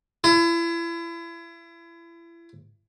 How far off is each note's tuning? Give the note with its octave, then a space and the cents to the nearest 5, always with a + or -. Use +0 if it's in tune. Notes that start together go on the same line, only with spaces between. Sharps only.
E4 +35